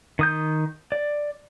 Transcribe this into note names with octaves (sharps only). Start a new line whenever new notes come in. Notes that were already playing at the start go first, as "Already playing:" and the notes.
D#3 D#6 G6
D5